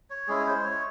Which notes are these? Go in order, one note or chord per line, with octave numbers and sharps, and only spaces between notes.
C#5
G#3 C#4 E4 G#4
C#5
C5
C#5